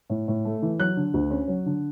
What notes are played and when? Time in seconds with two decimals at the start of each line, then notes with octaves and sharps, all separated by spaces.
0.10 A2
0.28 A2
0.45 A3
0.62 E3
0.79 F#3 F#6
0.97 D3
1.14 D2
1.31 C#4
1.48 F#3
1.66 D3